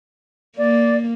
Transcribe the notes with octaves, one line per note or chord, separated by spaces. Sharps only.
A#3 D5